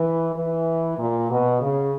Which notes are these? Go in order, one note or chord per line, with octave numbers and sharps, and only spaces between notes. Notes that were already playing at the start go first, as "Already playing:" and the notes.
Already playing: E3
E3
A#2
B2
C#3